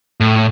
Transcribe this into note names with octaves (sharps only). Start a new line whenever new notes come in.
A2